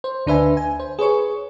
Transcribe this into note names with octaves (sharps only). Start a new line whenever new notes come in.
C5
D2 D4 B4 E5 G#5
G#5
C5
G#4 B4 C#5 C#6